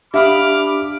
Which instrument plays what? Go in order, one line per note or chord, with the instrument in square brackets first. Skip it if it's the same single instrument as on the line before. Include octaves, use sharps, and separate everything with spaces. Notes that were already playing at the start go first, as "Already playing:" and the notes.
[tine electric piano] D4 G4 [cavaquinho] E5 F5 D#6 [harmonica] B5 D6 F6